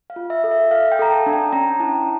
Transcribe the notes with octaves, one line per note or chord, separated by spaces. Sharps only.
F5
F4
E5
A4
E5
A4 F5
G5
A4 A#5
A5
D4
G5
C#4 A#5
E4 A5